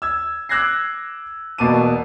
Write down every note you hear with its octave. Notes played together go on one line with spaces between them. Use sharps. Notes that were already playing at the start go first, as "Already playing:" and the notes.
E6 G#6
D6 E6 F#6 G#6 A#6 C7
E1 B2 A#3 A5 D6 D#7